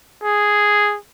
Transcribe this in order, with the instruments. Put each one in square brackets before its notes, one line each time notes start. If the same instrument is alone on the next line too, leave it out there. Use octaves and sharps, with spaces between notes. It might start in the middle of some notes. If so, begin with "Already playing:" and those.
[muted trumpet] G#4